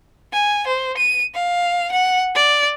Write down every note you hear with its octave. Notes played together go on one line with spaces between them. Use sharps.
G#5
C5
D#7
F5
F#5
D5